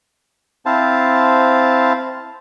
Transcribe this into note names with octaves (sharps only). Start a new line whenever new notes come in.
C4 E4 C5 F5 A5